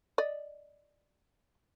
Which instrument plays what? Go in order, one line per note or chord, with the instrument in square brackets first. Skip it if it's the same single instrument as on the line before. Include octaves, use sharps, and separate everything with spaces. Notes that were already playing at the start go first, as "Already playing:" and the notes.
[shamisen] D5 D#5